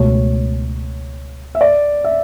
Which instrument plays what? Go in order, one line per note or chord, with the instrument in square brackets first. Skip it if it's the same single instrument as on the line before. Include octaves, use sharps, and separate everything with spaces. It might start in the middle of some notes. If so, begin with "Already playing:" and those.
Already playing: [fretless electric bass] C#2 B2 A3 [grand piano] C#5
[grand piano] E5
D5
E5